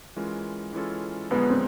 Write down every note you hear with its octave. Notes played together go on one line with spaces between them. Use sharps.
E3 G#3 C#4 F4 A#4
E3 G#3 C#4 F4 A4
F#2 D3 F3 G#3 B3 C#4
C4